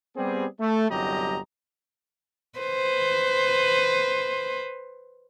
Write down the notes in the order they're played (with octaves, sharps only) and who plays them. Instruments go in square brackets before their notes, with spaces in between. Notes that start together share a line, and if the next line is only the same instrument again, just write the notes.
[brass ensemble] G3 B3 C4 G4 G#4
A3
G1 C2 F#3 G4 D#5 A#5
[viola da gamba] B4 C5